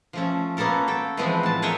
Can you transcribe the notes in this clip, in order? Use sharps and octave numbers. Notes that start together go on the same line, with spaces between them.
F3 A3 C#4
A#3 B3 C#4 A4 A#4
A4 G5
E3 F3 G#3 A3 B3 C4
A2 A5
G#4 A#4 C#5 D#5 E5 G5